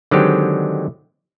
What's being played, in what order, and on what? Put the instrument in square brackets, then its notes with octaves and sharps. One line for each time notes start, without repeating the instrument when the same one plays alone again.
[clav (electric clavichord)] D3 D#3 F#3 G#3 C4 G4